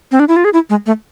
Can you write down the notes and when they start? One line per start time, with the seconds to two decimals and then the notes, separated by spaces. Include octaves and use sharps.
0.12 C4
0.20 D4
0.28 E4
0.36 F4
0.45 G#4
0.53 E4
0.70 G#3
0.86 A3